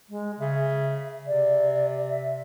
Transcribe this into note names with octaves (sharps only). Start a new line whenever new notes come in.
G#3
C#3 E5
C3 D5
E5